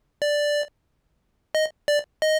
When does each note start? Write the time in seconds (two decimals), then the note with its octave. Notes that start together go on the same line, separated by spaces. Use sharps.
0.22 D5
1.55 D#5
1.88 D5
2.22 D#5